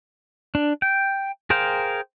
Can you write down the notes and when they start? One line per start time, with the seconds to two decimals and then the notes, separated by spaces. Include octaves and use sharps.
0.55 D4
0.82 G5
1.50 G#4 A#4 C5 F5 G5